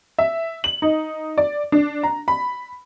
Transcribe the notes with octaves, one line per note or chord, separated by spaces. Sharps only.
E5
F#7
D#4
D5
D4
A#5
B5